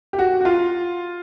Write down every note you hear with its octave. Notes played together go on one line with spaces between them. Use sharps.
G4
F#4
F#4
F4